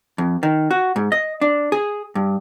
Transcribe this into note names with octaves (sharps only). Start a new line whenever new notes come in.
F2
D#3
F#4
G#2
D#5
D4
G#4
G2